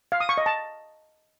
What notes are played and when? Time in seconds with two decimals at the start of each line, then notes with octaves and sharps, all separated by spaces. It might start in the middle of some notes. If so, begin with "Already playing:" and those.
0.12 F5
0.20 D#6
0.29 C#6
0.38 D#5
0.46 A5